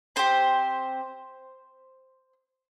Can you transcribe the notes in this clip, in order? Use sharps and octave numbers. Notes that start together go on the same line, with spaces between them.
C4 G4 C5